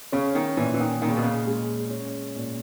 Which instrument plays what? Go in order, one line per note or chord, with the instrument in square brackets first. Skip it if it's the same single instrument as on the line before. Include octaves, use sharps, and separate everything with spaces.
[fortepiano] C#3 [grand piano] C#4
[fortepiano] D#3
[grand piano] A#2 [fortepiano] E3
[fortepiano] E3
D#3
[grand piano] A#2 [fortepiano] D#3
[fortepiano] C#3
B2
C#3
[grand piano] G#3
C#4
A#2